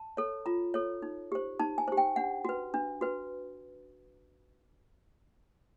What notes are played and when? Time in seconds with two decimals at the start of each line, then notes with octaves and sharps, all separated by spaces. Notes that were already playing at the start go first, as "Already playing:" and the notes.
Already playing: A5
0.17 A4 C#5
0.46 F4 A#5
0.74 A4 C#5
1.02 D#4
1.32 G4 C5
1.59 D#4 A5
1.78 G#5
1.88 G4 C5
1.97 G5
2.16 D4 F#5
2.45 F#4 B4
2.74 D4
3.01 F#4 B4